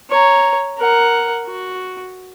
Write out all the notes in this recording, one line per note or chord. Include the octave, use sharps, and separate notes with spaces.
C#5 A#5
A#4 F#5
F#4